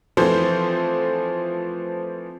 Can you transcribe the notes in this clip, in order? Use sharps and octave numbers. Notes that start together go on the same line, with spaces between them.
E3 F3 A3 C4 C5